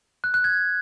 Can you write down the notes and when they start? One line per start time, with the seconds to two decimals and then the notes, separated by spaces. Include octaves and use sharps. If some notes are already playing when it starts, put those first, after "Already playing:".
0.24 F#6
0.34 F#6
0.44 G#6